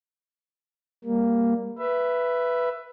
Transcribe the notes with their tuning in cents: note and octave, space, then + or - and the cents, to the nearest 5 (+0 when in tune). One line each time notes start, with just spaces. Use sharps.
G3 +20 A#3 +0
B4 +0 E5 +15